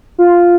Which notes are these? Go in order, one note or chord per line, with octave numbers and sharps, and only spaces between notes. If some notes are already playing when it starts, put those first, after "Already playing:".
F4